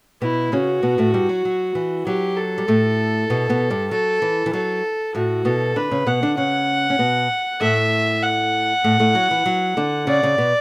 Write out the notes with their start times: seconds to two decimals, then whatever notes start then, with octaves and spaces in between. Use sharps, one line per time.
0.21 B2 B3 E4
0.52 C#3 C#4 F#4
0.83 B2 B3
0.98 A2 A3
1.14 G2 G3
1.29 F#3
1.45 F#3
1.75 E3
2.06 F#3 G4
2.37 A4
2.58 G3
2.68 A2 A3
3.30 B2 B3
3.49 B2 B3
3.70 G2 G3
3.91 F#3 A4
4.22 E3
4.46 E3
4.53 F#3 A4
5.15 A2 A3 F#4
5.45 B2 B3 A4
5.76 D3 D4 B4
5.91 C#3 C#4
6.07 B2 B3 F#5
6.22 D3 D4
6.37 C#3 C#4 F#5
6.90 C#4
6.99 B2 B3
7.61 A2 A3 E5
8.23 F#5
8.84 A2 A3
9.00 A2 A3
9.15 F#3
9.31 E3
9.46 F#3
9.77 D3 D4
10.07 C#3 C#4 D5
10.23 C#3 C#4
10.38 B2 B3